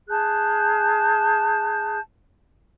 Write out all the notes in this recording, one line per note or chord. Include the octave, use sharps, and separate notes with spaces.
G#4 A5 F#6 G6